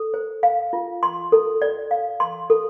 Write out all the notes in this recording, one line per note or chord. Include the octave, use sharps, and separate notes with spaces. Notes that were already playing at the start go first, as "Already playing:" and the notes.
Already playing: A4
C5
F5
F4
C6
A4
D5
F5
C6
A4